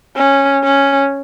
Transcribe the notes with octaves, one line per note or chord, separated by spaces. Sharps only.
C#4
C#4